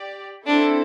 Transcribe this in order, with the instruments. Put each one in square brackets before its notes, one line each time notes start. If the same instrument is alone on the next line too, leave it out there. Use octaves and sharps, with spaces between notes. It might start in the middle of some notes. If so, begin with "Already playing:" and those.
Already playing: [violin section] G4 D5
[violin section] C4 E4 A4 [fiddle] D4